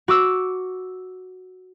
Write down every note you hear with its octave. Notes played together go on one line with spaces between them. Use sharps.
F#4 D6 E6